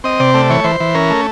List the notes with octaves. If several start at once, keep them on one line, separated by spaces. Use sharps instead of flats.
C4 D#5
C3 D5
A3 D5
E3 C#5
E3 C5
E3
C#4 A#4
A3